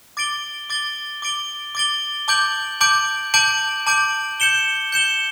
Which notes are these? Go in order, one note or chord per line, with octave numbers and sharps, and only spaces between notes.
D6 A6 D7 G7
D6 A6 D7 G7
D6 A6 D7 G7
D6 A6 D7 G7
A5 D6 G6 D7 F#7
A5 D6 G6 D7 F#7
A5 D6 G6 D7 F#7
A5 D6 G6 D7 F#7
G6 C#7 E7 G7
G6 C#7 E7 G7